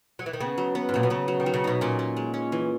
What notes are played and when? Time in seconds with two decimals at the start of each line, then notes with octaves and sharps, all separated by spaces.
0.19 F#3
0.26 E3
0.33 D#3
0.40 C#3 B3
0.58 F#3
0.75 B3
0.89 G#2
0.94 A#2 F#3
1.03 B2
1.10 C#3 B3
1.28 F#3
1.40 D#3
1.46 F#3
1.54 C#3
1.64 B2 D#4
1.81 A#2 C#4
1.99 C#4
2.17 G#3
2.34 C#4
2.52 E3